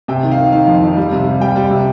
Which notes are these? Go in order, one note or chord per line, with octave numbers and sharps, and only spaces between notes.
C3 G5
D#3
F5
D#3
D#3 F5
F2
D#3
G3
C3
G3
G3 G5
G3
C3